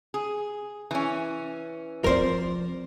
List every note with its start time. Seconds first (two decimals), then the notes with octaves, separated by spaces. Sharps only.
0.14 G#4
0.91 E3 C#4
2.04 F3 C4 A#4 C5 D5